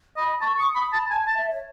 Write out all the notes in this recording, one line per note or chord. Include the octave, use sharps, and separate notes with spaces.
D#5 B5
A5 C#6
C#6 D#6
B5 D#6
A5 B5
G#5 A5
A5
E5
C#5